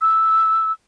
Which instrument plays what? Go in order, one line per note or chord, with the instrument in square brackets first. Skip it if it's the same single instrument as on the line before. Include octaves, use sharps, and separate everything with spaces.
[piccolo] E6